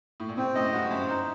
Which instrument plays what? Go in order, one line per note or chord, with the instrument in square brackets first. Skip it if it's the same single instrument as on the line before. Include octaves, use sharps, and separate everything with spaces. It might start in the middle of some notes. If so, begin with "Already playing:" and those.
[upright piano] A2
A#2
[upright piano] A2 C3 [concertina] C4
[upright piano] F#2 A2 [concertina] D#5
[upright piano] G2 [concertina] F#4
[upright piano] F#2 [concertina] C5
[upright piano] F#2 [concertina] D#4